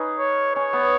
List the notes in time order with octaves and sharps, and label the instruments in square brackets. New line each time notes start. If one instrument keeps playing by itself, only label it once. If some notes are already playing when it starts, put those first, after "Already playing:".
Already playing: [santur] C#4 D#4 G#4 B4
[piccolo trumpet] C#5
[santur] C#4 [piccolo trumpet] C#5
[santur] B3